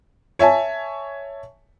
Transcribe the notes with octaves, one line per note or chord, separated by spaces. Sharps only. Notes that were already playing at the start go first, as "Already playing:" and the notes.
C#5 E5 G#5 A5